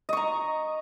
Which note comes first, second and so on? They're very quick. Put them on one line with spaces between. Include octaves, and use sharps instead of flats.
D#5 C#6 A#5